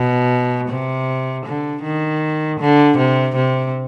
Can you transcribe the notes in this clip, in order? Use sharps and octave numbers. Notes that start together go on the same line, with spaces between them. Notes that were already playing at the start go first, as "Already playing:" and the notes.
Already playing: B2
C3
D3
D#3
D3
C3
C3